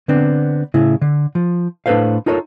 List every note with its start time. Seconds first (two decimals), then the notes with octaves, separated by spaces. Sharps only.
0.08 D3 B3 C4 D4
0.74 A2 C#3 E4
1.01 D3
1.35 F3
1.86 A2 D4 A4 B4 C5 F5
2.26 D#4 F4 A4 A#4 C#5